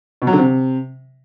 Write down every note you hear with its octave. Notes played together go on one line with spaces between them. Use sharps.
B2
F#3
D3
C3